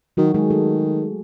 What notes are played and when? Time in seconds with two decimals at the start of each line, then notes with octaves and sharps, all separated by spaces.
0.17 D#3 F#3 F#4
0.34 D#3 G#3 G#4
0.50 A3 A4